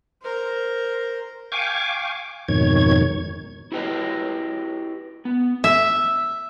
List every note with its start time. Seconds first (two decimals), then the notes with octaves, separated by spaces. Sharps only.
0.22 A#4 C5
1.52 F5 G5 G#5 C#6 D6
2.48 F2 G#2 B2 D#3 C#5 G#6
3.72 E4 F#4 G4 A4 B4 D#5
5.25 B3
5.64 E5